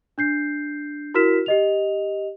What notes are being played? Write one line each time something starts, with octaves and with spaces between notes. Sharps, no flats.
D4 G6 C7
E4 F#4 A#4 F6 B6 E7
G4 D#5 F7